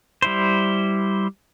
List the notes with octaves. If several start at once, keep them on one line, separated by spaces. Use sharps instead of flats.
G3 E4 C5